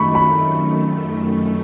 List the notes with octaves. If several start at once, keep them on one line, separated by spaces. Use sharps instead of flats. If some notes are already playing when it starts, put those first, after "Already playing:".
Already playing: F#2 D#3 A3 B5 C#6
B5